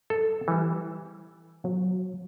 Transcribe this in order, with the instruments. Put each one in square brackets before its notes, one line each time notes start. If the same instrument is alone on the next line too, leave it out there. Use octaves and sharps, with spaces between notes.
[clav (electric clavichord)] A4
E3 G3
[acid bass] F#3